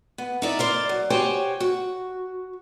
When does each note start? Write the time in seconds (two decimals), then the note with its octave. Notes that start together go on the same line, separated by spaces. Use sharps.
0.18 B3
0.42 D#4 E4 D5
0.59 A#4 C5 D5
0.89 F#3
1.10 F#4 G4 C5 C#5 G5 G#5
1.60 F#4